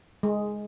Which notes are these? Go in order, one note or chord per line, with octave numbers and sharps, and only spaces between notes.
G#3